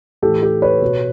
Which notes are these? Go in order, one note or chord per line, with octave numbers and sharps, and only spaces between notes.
A2 E3 G4 A4
G4 A4
B4 C#5
B2